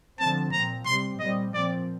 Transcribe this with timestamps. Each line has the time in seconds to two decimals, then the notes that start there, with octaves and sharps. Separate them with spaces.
0.20 D3 F3 C4 A5
0.52 A#2 F3 C4 A#5
0.86 C3 G3 C4 C6
1.20 A#2 G3 C4 D#5
1.54 A#2 F3 C4 D5